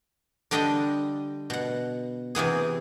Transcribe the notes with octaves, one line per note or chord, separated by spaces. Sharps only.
D3 G3 D4 D#5 F#5 G5
B2 F#5
C3 E3 B3 G#4